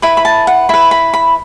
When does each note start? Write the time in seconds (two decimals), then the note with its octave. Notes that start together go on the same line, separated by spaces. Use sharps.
0.02 E4 B4 B5
0.17 B5
0.25 A5
0.47 F#5
0.69 E4 B4 B5
0.91 B5
1.13 B5